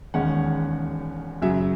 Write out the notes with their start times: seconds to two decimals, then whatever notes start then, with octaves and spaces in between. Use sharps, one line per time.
0.14 E1 D#2 D#3 G#3 C#4 F#5
1.42 F#2 C#3 F#3 E5